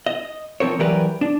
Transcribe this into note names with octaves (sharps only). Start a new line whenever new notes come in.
D#5
F3 C4 A#4 C#5
E3 F#3 G3 G4 A#4 B4
D4